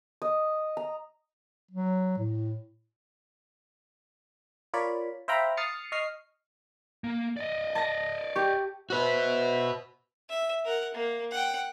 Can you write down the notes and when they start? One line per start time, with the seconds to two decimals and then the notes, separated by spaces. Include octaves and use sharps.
0.22 D#5
0.77 A#5
1.71 F#3
2.18 A2
4.74 F4 A#4 C#5 D5 B5
5.28 C5 E5 F5 G5 A#5 B5
5.57 D#6 F6 A6 C7 C#7
5.92 D#5 C#6 D#6 F6 C7
7.04 A#3
7.37 D5 D#5
7.75 A5 A#6
8.35 G4 C#6
8.90 F#4 B4 C5 E5
10.29 E5
10.65 A#4 F#5
10.95 A#3
11.32 F#5 G5